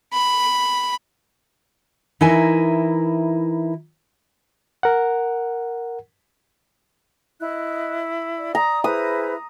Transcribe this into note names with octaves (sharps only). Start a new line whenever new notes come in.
B5
E3 D#4 E4 A#4 G#5
A#4 F#5
E4 D#5 F#6
D5
A#5 D#6
E4 G#4 B4 C5 D#6